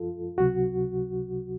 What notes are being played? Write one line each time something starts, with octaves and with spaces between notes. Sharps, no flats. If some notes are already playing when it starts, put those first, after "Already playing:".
Already playing: F#2 F3 F4 A4
C#2 C3 F#3 F#4